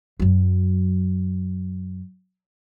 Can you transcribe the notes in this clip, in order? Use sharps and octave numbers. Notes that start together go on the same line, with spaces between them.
F#2 F#3